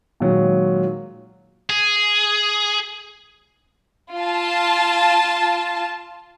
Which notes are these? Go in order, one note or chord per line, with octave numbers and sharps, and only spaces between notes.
A#2 D#3 F#3 G#3
G#4
F4 A5